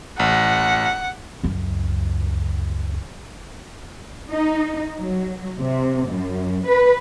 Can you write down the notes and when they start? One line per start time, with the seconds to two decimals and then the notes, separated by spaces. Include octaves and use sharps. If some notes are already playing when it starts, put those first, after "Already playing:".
0.19 A1 F#5
1.44 C#2 F#2
4.31 D#4
4.99 F#3
5.61 C3
6.11 F#2
6.67 B4